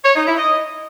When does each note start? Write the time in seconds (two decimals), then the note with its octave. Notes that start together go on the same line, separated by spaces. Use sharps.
0.05 C#5
0.16 D#4
0.27 E4
0.38 D#5